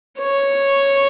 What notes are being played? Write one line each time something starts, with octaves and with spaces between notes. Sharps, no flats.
C#5